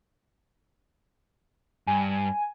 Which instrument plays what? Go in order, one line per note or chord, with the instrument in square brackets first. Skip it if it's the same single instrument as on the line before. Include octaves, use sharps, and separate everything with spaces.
[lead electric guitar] G2 [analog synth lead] G#5